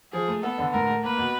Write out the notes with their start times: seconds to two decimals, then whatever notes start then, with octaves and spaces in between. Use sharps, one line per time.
0.13 F3 G#4
0.28 A3
0.43 B3 A4
0.58 D3
0.73 A2 A#4
0.87 A3
1.03 A#3 B4
1.18 B2